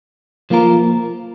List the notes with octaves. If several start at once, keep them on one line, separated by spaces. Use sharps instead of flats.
F3 A#3 F4 A#4